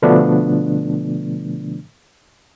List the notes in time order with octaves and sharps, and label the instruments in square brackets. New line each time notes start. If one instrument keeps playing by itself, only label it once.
[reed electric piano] B2 D3 F3 A3 B3 D4